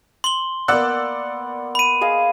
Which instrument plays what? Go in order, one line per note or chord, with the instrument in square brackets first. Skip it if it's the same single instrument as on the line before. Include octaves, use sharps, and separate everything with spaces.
[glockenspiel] C6 G7
[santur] A#3 B3 F#5 [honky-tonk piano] D5 E6 F#6
[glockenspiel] B5 D#7
[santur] G#4 D#5 F5